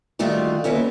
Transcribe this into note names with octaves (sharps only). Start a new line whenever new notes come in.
D3 D#3 G3 A3 F4 F#4
D#2 F#3 B3 C#4 E4